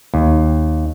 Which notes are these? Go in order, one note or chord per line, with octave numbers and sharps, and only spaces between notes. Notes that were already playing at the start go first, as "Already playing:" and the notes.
D#2